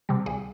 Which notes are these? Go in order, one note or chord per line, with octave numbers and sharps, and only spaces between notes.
C3 G3
C2 G#4